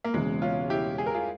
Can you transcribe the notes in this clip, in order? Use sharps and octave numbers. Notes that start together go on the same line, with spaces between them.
A#3
E1 E2 C#3 G#3
C#4 F4
E4 G4
G#4
A#4
F4 G#4